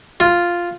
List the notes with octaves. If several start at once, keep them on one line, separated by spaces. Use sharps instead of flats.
F4